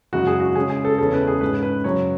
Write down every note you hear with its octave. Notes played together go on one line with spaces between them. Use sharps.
F#2 C#3 G#3 F#4
G#4
F#4
C#3 G#3 C#4 G#4
G#4
A4
E2 C#3 G#3 C#4 A4
B4
G#4
G#2 G#3 C#4 B4
B4
F#2 C#3 F#3 C#4 C#5